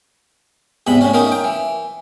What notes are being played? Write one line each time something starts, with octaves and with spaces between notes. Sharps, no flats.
E2 G#2 C3 B5
A2 C#4
D#3 A#3 C#4 D#4
G5
E3